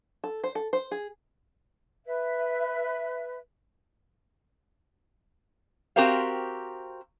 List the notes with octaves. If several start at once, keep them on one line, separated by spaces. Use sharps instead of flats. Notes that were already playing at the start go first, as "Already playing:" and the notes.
A4
C5
A4
C5
G#4
B4 E5
C4 F#4 G4 A#4 C5 F5